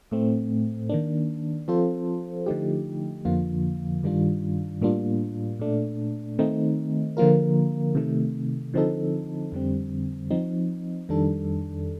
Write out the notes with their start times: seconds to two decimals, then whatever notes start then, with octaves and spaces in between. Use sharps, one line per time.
0.11 A2 A3 C4
0.89 D#3 A#3 D4
1.68 F3 C4 F4 A4 C5
2.46 D3 F3 A3 D#4 G4
3.25 F2 D3 F3 A#3 F4
4.03 G2 D#3 G3 D4 F4
4.82 A2 G3 A#3 D4 F4
5.59 A#2 A3 D4
6.39 D#3 A3 C4 D#4
7.17 D3 F3 A#3 F4 A#4
7.95 C3 D#3 A3
8.74 D3 F3 C4 D#4 A4
9.52 F2 D3 G3 C4
10.31 F3 C4 D#4
11.09 F2 D#3 G3 D4 A4